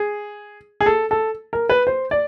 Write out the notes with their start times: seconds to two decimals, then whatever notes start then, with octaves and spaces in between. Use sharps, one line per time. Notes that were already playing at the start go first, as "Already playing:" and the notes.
Already playing: G#4
0.81 G#4
0.86 A4
1.11 A4
1.53 A#4
1.69 B4
1.87 C5
2.11 D5